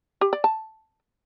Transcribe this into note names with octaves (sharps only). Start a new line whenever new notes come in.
G4
D5
A5